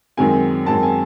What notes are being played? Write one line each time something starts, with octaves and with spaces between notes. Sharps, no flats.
F#2 D#3 G#3 C4 G#5
F#2 D#3 G#3 C4 A5
G#5